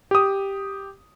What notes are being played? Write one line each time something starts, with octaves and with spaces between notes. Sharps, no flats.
G4 D#6